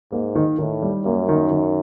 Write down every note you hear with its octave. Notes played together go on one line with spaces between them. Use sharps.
G#2 A#3
D#3
A2 D#3
G3
F#2 A#3
D#3
D#3